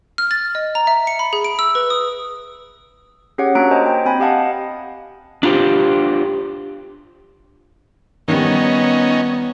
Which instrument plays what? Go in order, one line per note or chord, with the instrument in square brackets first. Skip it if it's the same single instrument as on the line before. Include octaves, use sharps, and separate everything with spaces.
[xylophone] F6
A6
D#5
A#5
E5
C#7
B5
G#4
D7
E6
B4
D#6
[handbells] C#4 G4 G#4 C#5 F#5
A#3 D4 F#4 A#5 F#6 D7
C5 D#5 G#5
G5
C4 G5 G#5 B5
G4 D#5 F5 F#5 A5
[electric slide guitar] D4 F4 G4 C5
[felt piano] D#3 G3 [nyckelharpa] B3 [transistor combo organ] C#4 D#4